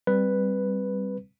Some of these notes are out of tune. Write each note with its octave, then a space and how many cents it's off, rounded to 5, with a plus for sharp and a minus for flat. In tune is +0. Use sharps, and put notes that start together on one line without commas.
G3 +0 C4 +0 B4 +0